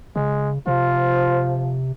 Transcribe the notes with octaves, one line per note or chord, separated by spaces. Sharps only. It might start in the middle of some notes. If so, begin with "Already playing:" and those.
C#3 G#3
C3 F3 F4